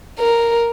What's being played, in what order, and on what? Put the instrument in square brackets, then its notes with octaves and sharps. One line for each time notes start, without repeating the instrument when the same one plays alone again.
[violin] A#4